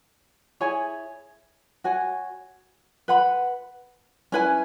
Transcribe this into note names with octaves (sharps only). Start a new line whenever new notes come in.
E4 G#4 C#5 G#5
F#4 C#5 G#5
B4 F#5 B5
C#4 E4 B4 G#5